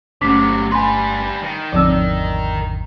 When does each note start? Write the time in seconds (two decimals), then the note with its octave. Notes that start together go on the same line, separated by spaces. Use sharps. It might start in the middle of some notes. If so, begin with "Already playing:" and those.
0.21 G1 C3 F#3 A3 C#4 D6 B6
0.72 G3 B4 G#5 B5 C6
1.43 D#3
1.72 G#1 E2 D3 F3 C4 D5 E6